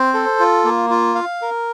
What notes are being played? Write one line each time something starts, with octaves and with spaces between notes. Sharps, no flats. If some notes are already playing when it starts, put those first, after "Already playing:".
Already playing: C4 C5
A4
F4
A#3
F4
F5
A#4